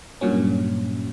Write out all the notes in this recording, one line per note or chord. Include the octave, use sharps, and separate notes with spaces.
G2 A#2 F#3 C#4